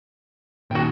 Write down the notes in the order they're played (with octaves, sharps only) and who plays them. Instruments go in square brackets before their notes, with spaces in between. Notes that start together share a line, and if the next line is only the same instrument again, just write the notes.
[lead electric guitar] A#2 D#3 [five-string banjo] F#4 G5